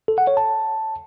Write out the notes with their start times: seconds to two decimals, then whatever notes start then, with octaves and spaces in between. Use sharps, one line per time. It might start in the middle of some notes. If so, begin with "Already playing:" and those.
0.08 A4
0.18 F#5
0.27 C#5
0.37 A5